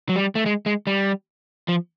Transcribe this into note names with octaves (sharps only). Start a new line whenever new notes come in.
F#3
G3
A3
G#3
G#3
G3
F3